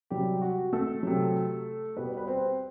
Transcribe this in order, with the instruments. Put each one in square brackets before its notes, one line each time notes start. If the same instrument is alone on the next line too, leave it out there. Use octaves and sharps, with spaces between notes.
[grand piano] C3 F#3 G3 G4
F#4
A3 A4
C3 F#3
B2 G3 B3 B4
B4
C4 C5